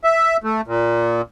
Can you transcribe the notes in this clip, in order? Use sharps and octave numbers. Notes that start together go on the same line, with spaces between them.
E5
A3
A#2